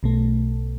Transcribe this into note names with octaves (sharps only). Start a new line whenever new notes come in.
B1 B2 A3